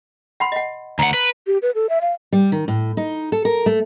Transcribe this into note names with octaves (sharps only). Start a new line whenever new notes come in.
F#5 B5 C6
D#5 F#5
D2 F#5 A#5
B4
G4
B4
A4
E5
F5
G3
D#3
A2
D#4
A4
A#4
A3